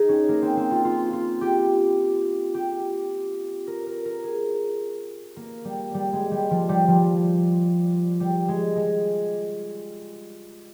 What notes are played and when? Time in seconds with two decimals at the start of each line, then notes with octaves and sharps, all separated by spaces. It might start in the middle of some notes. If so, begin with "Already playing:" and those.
Already playing: D#4 G#4
0.09 C#4
0.29 A#3
0.42 C4
0.57 C4
0.71 F4
0.85 F4
1.13 F4
1.41 G4
2.54 G4
3.67 A#4
3.87 A#4
4.05 A#4
4.24 G#4
5.36 A#3
5.65 G3
5.94 G3
6.13 G#3
6.31 G3
6.51 F3
6.69 G3
6.88 F3
8.20 G3
8.48 G#3
8.76 G#3